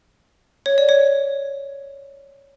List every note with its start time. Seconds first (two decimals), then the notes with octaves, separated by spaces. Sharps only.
0.66 C#5
0.78 D5
0.89 C#5